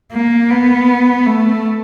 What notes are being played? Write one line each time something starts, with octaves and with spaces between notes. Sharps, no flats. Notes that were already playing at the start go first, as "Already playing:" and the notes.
A#3
B3
A3